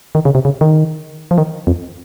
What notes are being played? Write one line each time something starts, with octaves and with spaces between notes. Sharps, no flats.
D#3
C#3
C3
C#3
D#3
F3
D#3
F2